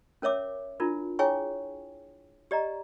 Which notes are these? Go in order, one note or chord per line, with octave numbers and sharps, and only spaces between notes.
C#4 A#4 C#5 E5 D6
D4 E4 F4 A#4
E4 G#4 C#5 G5 G#5 C#6
G4 D5 D#5 A#5